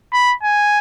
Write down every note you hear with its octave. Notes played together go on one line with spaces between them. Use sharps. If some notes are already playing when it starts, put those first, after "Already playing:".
B5
G#5